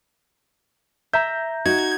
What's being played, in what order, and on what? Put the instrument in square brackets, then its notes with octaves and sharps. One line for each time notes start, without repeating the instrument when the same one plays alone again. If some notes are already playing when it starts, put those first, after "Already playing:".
[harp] E5 A#5 [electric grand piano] G6
[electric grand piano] D#4 [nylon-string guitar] F#4 [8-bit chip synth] G#6